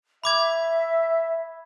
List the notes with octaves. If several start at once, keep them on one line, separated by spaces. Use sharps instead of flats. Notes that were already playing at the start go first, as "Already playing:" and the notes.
E5 B5 D6 G#6